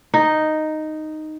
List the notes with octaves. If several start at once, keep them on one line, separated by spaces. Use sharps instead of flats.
D#4